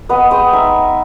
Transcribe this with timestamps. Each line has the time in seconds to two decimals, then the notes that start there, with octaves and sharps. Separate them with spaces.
0.09 B3 B4 D#5
0.31 G#3 D#5 G5
0.53 D#4 E5 G#5